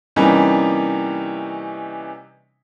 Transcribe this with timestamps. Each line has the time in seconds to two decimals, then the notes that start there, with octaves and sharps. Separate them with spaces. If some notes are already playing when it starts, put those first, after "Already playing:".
0.16 C3 E3 G3 A#3 C#4 D#4